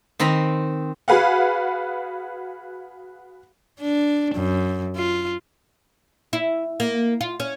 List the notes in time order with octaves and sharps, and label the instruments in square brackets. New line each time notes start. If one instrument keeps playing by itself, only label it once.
[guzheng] D#3 C4 A#5 B5
[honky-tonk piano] F#4 G#4 B4 F5 F#5
[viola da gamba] D4
F#2
F4
[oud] E4
A#3
F4
C#4